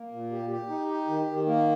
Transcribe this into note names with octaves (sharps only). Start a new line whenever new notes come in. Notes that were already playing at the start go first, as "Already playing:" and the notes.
Already playing: A#3
A#2
G4
G4
D#4
G4
D#3
D#3
A#3